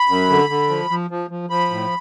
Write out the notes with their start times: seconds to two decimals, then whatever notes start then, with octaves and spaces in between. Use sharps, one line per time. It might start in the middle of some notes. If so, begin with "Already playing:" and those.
Already playing: B5
0.08 F#2
0.30 D3
0.49 D3
0.69 F3
0.90 F3
1.10 F3
1.30 F3
1.50 F3 B5
1.71 A2